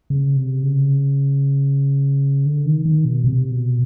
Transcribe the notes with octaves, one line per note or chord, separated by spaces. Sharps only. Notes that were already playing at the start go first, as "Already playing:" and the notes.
C#3
C3
C#3
D3
D#3
D#3
B2
C3
B2